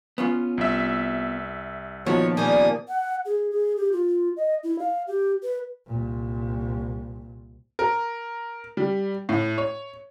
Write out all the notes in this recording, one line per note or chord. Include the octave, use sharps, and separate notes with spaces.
B3 C#4 F4
C2 E5
A#2 D#3 F3 B3 F#4 C#5
G3 A#3 C#4 G#5 D#6
F#5
G#4
G#4
G4
F4
D#5
E4
F5
G4
B4
C2 A#2
A#4
G3
A2
C#5